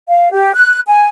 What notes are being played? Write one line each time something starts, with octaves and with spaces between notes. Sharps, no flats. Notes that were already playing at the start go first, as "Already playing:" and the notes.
F5
G4
F#6
G#5